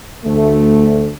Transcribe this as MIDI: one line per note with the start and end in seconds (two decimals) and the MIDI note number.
0.25 1.11 38
0.25 1.11 57